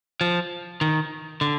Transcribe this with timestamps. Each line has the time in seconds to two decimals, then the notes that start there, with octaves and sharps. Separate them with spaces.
0.21 F3
0.81 D#3
1.41 D3